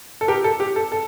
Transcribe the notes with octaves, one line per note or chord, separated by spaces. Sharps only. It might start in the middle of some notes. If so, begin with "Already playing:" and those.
A4
G4 A#4
A4
G4
A4
A4